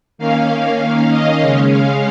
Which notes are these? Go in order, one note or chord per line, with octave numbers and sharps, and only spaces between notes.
D#3 A#3 C#4 F5
D#5
C#3 G#3 C#4 F5
F5